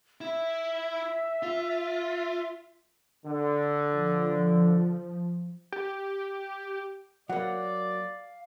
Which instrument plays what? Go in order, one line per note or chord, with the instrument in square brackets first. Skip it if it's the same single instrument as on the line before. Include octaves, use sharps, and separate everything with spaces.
[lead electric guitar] E4 [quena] E5
[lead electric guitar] F4
[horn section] D3
[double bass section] F3
[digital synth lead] G4
[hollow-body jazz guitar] F#3 A#3 [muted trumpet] D5 [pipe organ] F5 [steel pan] F#5